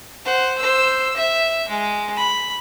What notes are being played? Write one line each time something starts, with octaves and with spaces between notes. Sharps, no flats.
C5 F#5
C5 E6
E5
G#3
B5